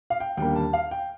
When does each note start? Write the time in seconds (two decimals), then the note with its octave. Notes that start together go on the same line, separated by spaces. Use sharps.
0.10 F5
0.20 G5
0.37 D#2 D3 G3 A#3 G5
0.56 A5
0.73 F5
0.91 G5